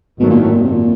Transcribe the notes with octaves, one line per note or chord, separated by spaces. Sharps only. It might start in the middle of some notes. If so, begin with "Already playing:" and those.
G#1 F#2 B2 D#3 F#3 A3
A#2
A2
A#2
C3
A#2